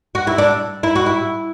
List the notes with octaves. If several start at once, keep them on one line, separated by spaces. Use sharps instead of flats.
F#4
E4
D4
E4
F#4
E4